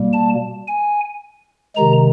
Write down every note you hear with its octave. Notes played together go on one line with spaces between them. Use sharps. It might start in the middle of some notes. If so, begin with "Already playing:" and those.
Already playing: B2 G3 A#3
A5
G#5
C3 D#3 G#3 A#5